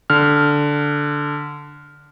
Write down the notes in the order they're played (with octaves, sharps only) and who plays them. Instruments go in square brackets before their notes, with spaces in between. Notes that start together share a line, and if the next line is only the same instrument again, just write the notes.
[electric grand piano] D3 F6